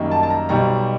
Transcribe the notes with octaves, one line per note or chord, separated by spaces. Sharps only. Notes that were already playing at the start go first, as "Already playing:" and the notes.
Already playing: F#2 D#3 G3 A#3 D#4
A5
A5
A#5
B1 B2 G3 A#5